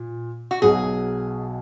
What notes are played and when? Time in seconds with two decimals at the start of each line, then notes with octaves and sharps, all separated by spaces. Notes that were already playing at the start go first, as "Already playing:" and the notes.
Already playing: A#2
0.51 F#4
0.62 B1 B2 F#3 G#4